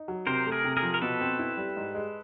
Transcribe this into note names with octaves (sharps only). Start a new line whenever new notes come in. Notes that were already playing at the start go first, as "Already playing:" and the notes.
Already playing: D#4
F#3
C3 A#4 C5
A3
G#4 A#4
C3
G#4 A#4
F3
A#4
B2 A4 B4
C4
E4
G3
G#2
G#3